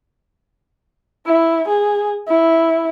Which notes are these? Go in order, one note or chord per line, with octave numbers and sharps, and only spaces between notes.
E4
G#4
E4